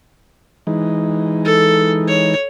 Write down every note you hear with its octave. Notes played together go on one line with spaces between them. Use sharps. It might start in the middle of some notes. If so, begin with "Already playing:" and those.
E3 G#3 D#4
A4
C#5